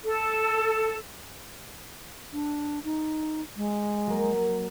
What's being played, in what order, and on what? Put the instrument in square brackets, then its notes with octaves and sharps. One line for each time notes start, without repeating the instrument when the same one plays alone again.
[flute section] A4
[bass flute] D4
D#4
G#3
[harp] F#3 A#3